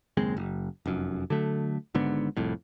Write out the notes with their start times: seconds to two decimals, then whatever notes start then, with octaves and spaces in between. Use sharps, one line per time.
0.17 F#1 D#2 G#3 C4
0.37 F#1
0.86 F1 F#2
1.30 D3 F#3 A3
1.95 G#1 G#2 D3 B3
2.37 C2 F2 A2